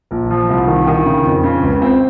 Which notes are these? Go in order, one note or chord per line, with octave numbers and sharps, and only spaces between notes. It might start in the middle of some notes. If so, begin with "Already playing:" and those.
A#1
F3
C2
D#3
D#3
C#3
F2
C#3
C#2
C4